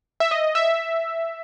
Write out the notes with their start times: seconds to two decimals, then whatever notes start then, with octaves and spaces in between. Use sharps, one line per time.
0.20 E5
0.31 D#5
0.55 E5